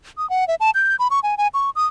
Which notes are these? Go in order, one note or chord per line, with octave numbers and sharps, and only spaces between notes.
D#6
F#5
E5
A5
G6
B5
C#6
G#5
G#5
C#6
D#6